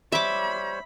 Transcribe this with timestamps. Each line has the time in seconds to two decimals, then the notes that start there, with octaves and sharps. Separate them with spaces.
0.12 G3 C5 C#5 E5 B5 D6